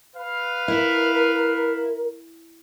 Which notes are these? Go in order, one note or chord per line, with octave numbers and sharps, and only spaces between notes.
B4 F5
E4 A#4